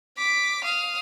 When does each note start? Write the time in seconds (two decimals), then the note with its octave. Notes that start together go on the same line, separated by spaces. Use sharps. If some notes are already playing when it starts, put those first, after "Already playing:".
0.18 D6 B6
0.64 F5 D#6